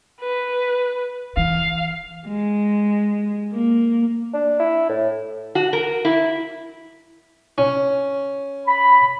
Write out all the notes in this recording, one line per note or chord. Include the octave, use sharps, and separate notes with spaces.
B4
E3 F5
G#3
A#3
D4
E4
A2
F#4
A#4
E4
C#4
B5